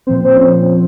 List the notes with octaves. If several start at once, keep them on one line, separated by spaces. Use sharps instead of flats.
A#2 F3 C4 C5
C5
C#4 C#5